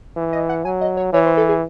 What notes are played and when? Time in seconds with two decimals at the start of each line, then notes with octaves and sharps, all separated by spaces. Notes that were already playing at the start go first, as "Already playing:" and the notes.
0.17 E3
0.33 D#5
0.49 F#5
0.65 F#3 G#5
0.81 D#5
0.97 C#5
1.13 E3 C#5
1.26 C5
1.37 A4
1.49 G#4